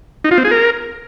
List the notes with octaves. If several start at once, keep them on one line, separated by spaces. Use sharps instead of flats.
D#4
F4
C4
G#4
A#4